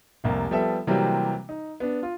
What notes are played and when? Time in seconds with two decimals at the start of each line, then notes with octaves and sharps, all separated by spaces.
0.24 F1 C2 A#3
0.51 F3 G3 B3 A4 E5
0.87 C3 E3 F#3 G3 A#3 C4
1.49 D#4
1.80 B3 D4
2.03 F4